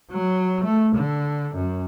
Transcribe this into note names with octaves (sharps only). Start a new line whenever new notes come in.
F#3
A3
D3
F#2